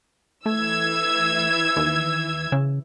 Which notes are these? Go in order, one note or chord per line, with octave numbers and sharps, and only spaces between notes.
E3 A3 E6 G#6
D#2
C#3